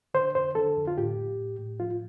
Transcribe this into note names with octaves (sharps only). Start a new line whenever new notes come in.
D3 C5
F2 C5
D3 A4
F2
F4
A2 G4
A2
A2
A2
F3 F4